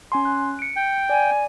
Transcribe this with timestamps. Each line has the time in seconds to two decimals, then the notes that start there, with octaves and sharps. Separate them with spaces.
0.12 C#4 G#5 C6
0.25 F#6
0.59 C#7 D7
0.76 G5
1.09 D5 G#5